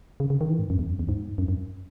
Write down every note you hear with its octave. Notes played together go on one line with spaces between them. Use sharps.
C#3
C#3
D#3
E3
G#2
F#2
E2
F#2
E2
G#2
F#2
F#2